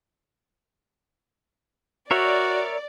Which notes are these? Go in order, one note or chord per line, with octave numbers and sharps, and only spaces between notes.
F#4 A#4 C#5 D5 E5